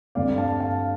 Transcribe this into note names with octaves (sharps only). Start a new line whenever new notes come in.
G2 D3 A3 C4 D5 F5
F5 A5
F5 A5